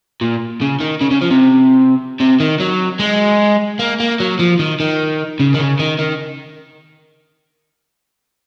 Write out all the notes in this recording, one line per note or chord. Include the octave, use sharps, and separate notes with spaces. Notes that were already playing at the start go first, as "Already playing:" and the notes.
A#2
C#3
D#3
C#3
C#3
F3
C3
C3
D#3
F#3
G#3
A#3
A#3
F#3
F3
D#3
D#3
C#3
D#3
C#3
D#3
D#3